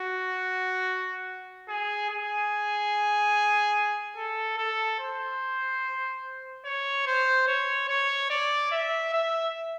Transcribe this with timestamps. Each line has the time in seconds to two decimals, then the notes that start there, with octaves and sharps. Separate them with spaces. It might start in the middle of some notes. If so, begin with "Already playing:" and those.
Already playing: F#4
1.68 G#4
2.10 G#4
4.17 A4
4.58 A4
4.99 C5
6.65 C#5
7.06 C5
7.47 C#5
7.89 C#5
8.30 D5
8.71 E5
9.13 E5